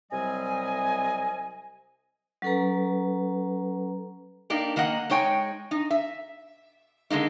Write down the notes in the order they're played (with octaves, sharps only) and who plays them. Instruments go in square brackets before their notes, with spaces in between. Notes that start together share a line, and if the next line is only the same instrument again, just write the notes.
[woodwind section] C2 C3 F#3 G3 D#5 G#5
[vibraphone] F#3 C#4 A4 B4 A#5
[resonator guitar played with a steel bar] A#3 D4 D#4 G4
D#3 A#3 D#5 F#5
G#3 D#4 C#5 G5 G#5
D#4
E5
D3 G#3 A#3 D#4